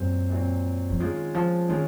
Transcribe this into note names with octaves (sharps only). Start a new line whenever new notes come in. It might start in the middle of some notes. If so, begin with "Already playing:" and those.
Already playing: F#2 A#2 F#3 C4
A#2 F#3 C4
F3
D#3 G#3 C#4 F4 G#4
F3
D#3 G#3 C#4 F4 G#4